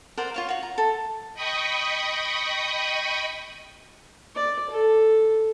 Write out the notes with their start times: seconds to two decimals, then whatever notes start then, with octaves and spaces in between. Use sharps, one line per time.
0.17 A#4 C5 D5 F#5
0.34 F4 C#5 F5
0.49 F#4 C#5
0.63 A#5
0.78 A4
1.34 D#5 G5 B5 C#6 D#6
4.35 D5
4.70 A4